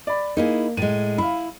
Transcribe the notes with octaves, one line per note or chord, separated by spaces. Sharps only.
D5 B5
A#3 D#4 E4 G#4
A2 G#3 D#7
E4 F5 B5